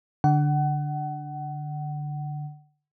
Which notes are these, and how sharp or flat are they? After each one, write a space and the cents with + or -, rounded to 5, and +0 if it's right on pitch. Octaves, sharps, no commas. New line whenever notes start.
D3 +0 F#5 +30